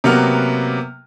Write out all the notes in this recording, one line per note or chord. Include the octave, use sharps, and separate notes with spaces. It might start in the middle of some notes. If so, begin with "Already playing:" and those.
C3 F#3 A#3 B3 F6